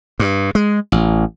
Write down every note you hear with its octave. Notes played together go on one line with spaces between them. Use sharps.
G2
G#3
A1